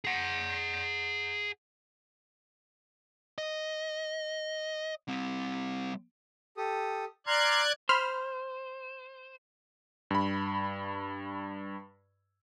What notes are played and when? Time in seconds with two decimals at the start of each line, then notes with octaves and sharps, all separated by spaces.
0.05 G#4 F#5
3.38 D#5
5.09 G3 C4
6.57 G4 A4 D#6
7.27 D5 A#5 C6 F6 F#6 G#6
7.89 C5 B5 C6 F6
10.11 G2 B5